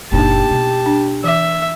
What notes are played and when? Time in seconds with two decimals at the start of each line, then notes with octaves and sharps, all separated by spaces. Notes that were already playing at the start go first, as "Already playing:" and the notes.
0.12 F#1 A#2 A#3 D4 D#4 G4 A5
0.51 B2
0.86 D4
1.24 E3 E5 D6